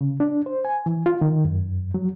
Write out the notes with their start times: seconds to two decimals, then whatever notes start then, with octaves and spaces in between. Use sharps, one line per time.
0.01 C#3
0.20 D4
0.46 C5
0.65 G#5
0.86 E3
1.06 F4
1.21 D#3
1.45 F#2
1.94 F#3